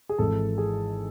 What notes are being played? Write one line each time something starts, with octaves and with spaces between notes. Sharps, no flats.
G#4
G#1 G#2 E3 A4
G#4